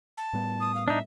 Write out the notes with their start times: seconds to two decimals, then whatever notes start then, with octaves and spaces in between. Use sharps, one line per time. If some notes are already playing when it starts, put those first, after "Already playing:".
0.17 A5
0.33 A2 G3 B3
0.60 D#6
0.75 F5
0.88 D4 D#4 E5